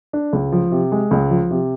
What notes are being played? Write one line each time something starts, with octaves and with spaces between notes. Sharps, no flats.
D4
C#2
F3
C3
G#3
C#2
F3
C3